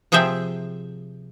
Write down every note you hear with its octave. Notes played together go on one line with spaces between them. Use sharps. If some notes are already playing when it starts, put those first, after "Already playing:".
C3 F3 G#4 C5 E5 G5